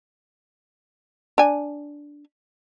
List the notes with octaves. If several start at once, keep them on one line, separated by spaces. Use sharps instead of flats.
D4 G#5